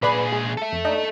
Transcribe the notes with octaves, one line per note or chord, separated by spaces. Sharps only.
A#2 G#4 B4 D5 B5
G#3
A4 E5
F2
D4 D#4